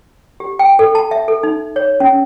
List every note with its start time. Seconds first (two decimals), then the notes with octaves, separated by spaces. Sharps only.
0.40 G4
0.59 G5
0.79 A4
0.95 A5
1.11 E5
1.28 A4
1.43 D#4
1.76 C#5
2.00 C#4